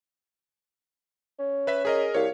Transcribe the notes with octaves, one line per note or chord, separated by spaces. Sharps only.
C#4
B4 E5 B6
G#4 A#4 D#5
C2 C#5 F5